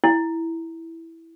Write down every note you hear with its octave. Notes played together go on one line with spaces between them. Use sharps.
E4